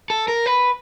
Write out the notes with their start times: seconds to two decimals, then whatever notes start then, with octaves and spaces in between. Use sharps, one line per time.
0.10 A4
0.28 A#4
0.46 B4